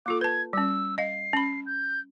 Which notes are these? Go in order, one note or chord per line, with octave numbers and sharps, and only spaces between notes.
A#3 F4 A4 D6
B4 A5 G#6
G3 C#4 E6
D#5 F5 C7
C#4 B5
G6